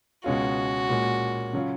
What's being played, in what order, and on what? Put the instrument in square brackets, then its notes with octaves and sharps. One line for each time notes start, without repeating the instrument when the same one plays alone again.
[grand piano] C#2 B2 G#3 C#4 F4 [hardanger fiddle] F#4
[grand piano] A#2 G#3 C#4
C#3 F#3 C#4 F4